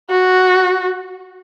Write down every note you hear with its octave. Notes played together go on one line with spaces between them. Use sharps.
F#4